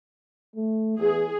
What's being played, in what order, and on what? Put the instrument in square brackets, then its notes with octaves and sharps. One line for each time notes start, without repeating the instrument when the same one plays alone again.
[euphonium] A3
[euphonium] E2 [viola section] G#4